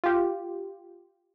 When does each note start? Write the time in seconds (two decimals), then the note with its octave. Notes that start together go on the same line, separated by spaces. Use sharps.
0.04 F4 G4